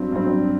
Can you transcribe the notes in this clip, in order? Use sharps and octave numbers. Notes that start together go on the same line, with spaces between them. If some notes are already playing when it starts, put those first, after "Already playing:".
Already playing: G2 F#3 C4
G2 F#3 C4